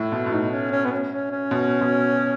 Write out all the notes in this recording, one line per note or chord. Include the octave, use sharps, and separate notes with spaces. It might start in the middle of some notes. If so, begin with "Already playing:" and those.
Already playing: A2 E4
B2
B2
A2 D#4
C#4
C#4
B3
C#4
C#4
C#4
B2
B2